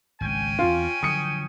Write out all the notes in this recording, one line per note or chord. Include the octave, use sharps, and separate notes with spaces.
G#1 C#2 C#4 G5 G#5
E2 C4 F4
D3 F3 F#3 D#6 C#7